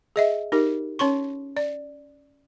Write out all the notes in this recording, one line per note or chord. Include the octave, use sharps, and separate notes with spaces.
G#4 D#5 E5
D#4 G4 A#4
C#4 C#5 C6 C#6
D5